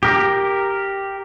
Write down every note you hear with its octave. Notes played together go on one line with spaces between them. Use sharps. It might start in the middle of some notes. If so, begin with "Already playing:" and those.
G4 A#4